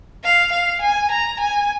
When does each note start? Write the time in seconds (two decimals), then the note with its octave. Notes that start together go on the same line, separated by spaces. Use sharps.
0.24 F5
0.53 F5
0.81 G#5
1.11 A#5
1.40 G#5